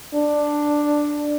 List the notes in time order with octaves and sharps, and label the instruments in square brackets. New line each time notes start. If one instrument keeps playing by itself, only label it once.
[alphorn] D4